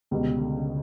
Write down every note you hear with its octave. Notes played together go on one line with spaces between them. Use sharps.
C#2 B2 D3 G3
C#3
D3
C#3